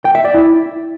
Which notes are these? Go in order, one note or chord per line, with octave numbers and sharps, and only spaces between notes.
G5
E5
D5
E4